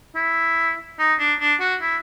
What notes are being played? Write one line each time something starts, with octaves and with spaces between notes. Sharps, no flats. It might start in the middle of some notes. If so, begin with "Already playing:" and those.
E4
D#4
D4
D4
F#4
E4